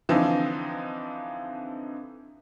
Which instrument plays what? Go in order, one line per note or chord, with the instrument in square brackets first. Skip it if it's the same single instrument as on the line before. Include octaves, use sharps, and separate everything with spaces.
[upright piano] D3 E3 F3 C4 D#4